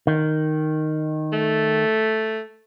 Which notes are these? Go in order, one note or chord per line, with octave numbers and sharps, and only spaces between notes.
D#3
A3